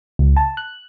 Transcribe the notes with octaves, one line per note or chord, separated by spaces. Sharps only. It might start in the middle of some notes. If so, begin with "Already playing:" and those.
C#2
A5
F#6